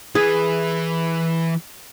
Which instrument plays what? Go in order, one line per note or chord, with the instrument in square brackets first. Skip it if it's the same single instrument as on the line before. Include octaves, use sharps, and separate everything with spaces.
[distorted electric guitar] E3 B4 [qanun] G#4